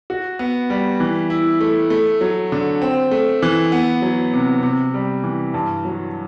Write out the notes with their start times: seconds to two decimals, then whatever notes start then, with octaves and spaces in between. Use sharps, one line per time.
0.10 F#4
0.39 B3
0.70 G3
1.00 E3
1.30 E4
1.61 A3
1.90 A3
2.21 F#3
2.52 D3
2.82 C4
3.11 A3
3.42 E3
3.72 B3
4.02 F#3
4.33 C3
4.63 C3
4.94 G3
5.24 E3
5.54 G2
5.85 F#3